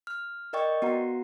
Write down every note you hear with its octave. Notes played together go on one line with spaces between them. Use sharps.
F6
A#4 D5 D#5 G5 C#6
B3 F#4 F#5 A#5